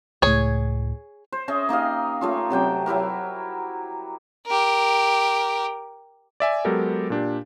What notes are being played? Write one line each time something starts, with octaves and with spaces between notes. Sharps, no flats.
C#2 A2 G#4 C#5
C5
C#4 G#4 D#5 E5
A#3 D#4 G4 F5
A3 C#4 F4
C3 F#3 G5 D6
F#3 E4 G4 A#4
G4 A#4
D5 E5 G#5
F#3 G#3 B3 G4 A4 A#4
A#2 D4 G4